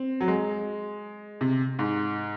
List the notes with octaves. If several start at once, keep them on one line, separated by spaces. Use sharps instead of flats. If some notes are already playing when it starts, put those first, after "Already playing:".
Already playing: C4
F#3
G#3
C3
G#2